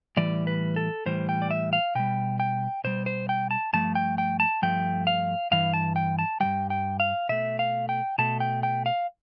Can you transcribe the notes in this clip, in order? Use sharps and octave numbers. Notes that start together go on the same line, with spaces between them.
A2 E3 G3 D5
B4
A4
A2 E3 G3 C5
G5
D5
E5
F5
B2 G3 G5
G5
B2 G3 C5
C5
G5
A5
G2 F3 A3 A5
G5
G5
A5
G2 F3 A3 G5
F5
G2 E3 F5
A5
G5
A5
G2 E3 G3 G5
G5
F5
B2 A3 E5
F5
G5
B2 A3 A5
G5
G5
F5